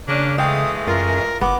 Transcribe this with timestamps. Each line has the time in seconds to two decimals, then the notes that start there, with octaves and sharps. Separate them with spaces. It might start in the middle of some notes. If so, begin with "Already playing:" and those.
0.08 C#3 A#3 C#4 D4
0.38 E3 G#3 A3 F5 G5 D#6
0.87 F#2 F4 A#4
1.41 F#1 B3 D6